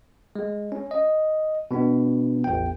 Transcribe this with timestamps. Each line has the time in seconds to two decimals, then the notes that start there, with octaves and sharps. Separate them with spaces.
0.35 G#3
0.72 C#4
0.91 D#5
1.71 B2 B3 D4
2.44 A1 E2 G5